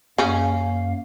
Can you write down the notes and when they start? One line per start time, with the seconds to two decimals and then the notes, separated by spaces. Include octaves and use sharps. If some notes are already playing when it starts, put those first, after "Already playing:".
0.18 F#2 C#3 A#3 C#4 F5